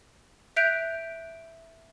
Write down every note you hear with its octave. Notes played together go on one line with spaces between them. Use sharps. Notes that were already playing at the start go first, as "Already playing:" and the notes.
E5 F#6 G6 D7 F7